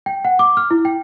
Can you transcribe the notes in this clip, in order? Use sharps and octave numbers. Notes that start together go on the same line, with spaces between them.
G5
F#5
D6
F6
E4
G5